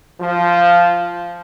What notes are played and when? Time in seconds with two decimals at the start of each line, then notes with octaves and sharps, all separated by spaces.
0.20 F3